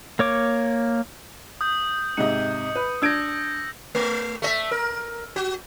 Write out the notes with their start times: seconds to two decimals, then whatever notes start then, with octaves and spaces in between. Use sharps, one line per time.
0.19 A#3 C#5 D6
1.61 D#6 G6
2.17 G#2 C3 D#5 C#7
2.75 B4
3.02 D4 E6 G6 G#6 A#6 D7
3.95 A3
4.42 A3 D#5 E5
4.71 A#4
5.36 F#4